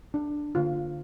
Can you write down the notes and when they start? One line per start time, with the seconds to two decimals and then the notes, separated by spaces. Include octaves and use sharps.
0.14 D4
0.55 D3 A#3 F4